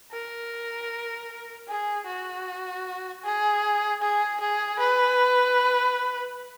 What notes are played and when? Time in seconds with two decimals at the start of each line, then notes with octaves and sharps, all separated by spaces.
0.12 A#4
1.68 G#4
2.06 F#4
3.24 G#4
4.02 G#4
4.40 G#4
4.79 B4